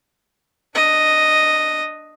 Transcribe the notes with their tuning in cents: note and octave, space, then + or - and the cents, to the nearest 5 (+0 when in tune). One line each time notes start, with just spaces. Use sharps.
D4 +20 D#5 +0